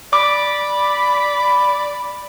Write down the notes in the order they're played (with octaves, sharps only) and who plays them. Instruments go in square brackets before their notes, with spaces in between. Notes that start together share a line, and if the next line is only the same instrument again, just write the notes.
[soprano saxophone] D5 [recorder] B5 [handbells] D6